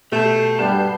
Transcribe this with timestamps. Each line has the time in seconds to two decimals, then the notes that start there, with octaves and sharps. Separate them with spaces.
0.12 B2 A3 G4 A5 G6 C7
0.59 G2 G3 B3 A5